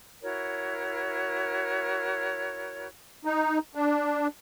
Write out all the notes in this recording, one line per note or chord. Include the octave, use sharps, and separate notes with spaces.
E4 F#4 A#4 C#5
D#4
D4